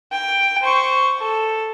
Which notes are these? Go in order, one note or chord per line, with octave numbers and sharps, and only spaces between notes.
G5
C5 C#6
A4